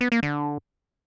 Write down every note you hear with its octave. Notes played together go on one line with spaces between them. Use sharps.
B3
A#3
D3